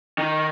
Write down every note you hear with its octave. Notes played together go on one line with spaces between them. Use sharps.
D#3